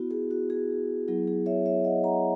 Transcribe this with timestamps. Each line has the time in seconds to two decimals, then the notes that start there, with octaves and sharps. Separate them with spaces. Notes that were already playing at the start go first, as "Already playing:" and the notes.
Already playing: B3 E4 F#4
0.11 G#4
0.31 F#4
0.50 G#4
1.08 F#3 B3 E4 G#4
1.28 G#4
1.46 C#5 E5
1.65 C#5 E5
1.84 D#5 F#5
2.04 F#5 A#5